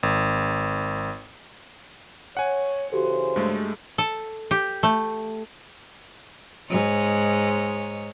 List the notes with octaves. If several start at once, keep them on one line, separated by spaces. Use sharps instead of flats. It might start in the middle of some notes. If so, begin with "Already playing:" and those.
G#1
C#5 F#5 G#5
C#3 E3 F#4 G4 A4 C5
G2 G#3 A3
A4
G4
A3
G#2 G#3 C#5